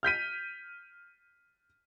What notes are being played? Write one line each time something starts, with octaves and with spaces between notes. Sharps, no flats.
F6 G6 B6 D#7